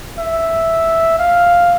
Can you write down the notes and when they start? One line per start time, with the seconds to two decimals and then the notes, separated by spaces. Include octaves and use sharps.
0.19 E5
1.19 F5